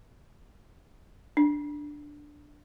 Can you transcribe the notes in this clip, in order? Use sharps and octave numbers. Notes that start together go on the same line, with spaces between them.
D4